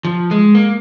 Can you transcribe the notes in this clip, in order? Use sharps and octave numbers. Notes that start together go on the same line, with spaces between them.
F3
G#3
A#3